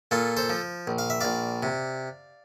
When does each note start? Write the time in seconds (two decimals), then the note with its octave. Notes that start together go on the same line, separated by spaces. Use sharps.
0.11 A#2 F4 A4
0.37 A4 C5
0.50 F3
0.87 A#1
0.98 F5
1.10 E5
1.21 A#1 D5 F5
1.63 C3